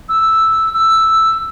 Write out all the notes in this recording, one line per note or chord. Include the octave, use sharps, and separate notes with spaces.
E6
E6